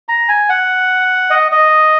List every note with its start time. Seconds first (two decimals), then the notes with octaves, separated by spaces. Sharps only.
0.09 A#5
0.29 G#5
0.49 F#5
1.30 D#5
1.52 D#5